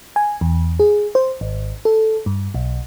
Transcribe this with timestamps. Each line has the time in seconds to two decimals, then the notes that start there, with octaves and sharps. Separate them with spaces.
0.16 G#5
0.41 E2
0.80 G#4
1.15 C5
1.41 G#1
1.85 A4
2.26 G2
2.54 B1